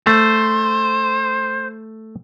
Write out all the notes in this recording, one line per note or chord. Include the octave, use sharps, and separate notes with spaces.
A3 C5